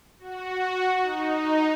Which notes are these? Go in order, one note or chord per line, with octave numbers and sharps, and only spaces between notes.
F#4
D#4